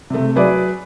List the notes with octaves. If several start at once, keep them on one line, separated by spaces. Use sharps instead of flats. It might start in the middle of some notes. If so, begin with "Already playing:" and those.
C3 A3
F#3 G#4 B4 D5 E5